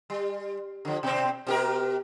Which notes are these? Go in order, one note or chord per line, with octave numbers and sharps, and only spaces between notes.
G3
D3 F3
B2 C4
B2 G4 A#4